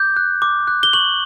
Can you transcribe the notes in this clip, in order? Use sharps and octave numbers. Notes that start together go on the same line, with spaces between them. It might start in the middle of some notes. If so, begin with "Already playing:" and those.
Already playing: D6 G6
F#6
D6
F#6
G7
C#6 F#7